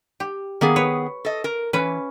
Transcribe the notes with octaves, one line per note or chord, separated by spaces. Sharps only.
G4
D#3 A#3 B3 G#4
B4 C#5
A4 D#5
A#4
E3 C#4 B4